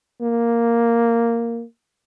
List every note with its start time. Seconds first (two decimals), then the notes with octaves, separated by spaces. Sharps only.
0.21 A#3